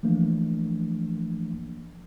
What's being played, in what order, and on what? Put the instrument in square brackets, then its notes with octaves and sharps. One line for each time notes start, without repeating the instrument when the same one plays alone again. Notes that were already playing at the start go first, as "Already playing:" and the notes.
[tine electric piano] E3 F3 A3 A#3 D4